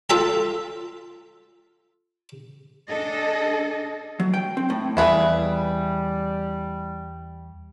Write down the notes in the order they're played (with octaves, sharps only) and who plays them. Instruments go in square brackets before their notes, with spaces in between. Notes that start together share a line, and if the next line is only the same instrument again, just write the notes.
[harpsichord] F4 A4 E5 A5
[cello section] D4 G#4 A4 D#5
[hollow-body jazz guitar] F#3
G5
C4
A2
[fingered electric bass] E2 [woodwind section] G3 [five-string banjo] E4 G#4 B4